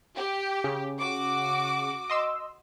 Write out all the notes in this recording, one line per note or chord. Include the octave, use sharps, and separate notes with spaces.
G4
C#3
F#4 D6
D#5 C6 E6